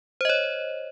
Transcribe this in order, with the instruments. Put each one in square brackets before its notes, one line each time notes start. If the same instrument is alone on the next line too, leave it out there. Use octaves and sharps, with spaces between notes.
[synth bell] C5
D#5
C#5